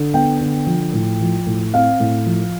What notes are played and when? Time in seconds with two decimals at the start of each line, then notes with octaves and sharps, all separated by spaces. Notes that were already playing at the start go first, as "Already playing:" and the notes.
Already playing: D3
0.14 B3 G5
0.41 D3
0.67 F3
0.93 A2
1.21 F3
1.46 A2
1.74 C4 F5
2.00 A2
2.26 F3